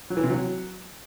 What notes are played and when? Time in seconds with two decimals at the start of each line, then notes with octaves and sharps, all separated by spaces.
0.10 F#3
0.17 E3
0.23 C3
0.30 F#3